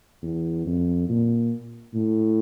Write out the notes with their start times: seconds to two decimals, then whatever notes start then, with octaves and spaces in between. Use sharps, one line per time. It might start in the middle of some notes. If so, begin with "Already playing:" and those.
0.22 E2
0.66 F2
1.09 A#2
1.94 A2